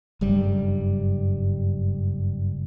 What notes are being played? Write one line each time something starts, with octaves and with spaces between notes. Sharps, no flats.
F#1 G2 G3